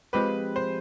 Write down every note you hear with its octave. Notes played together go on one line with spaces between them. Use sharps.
F3 G#3 C4 G4 B4
C5